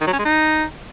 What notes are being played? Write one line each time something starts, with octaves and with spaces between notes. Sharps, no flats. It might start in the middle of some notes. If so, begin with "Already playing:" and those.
D#3
F#3
C#4
G#3
D#4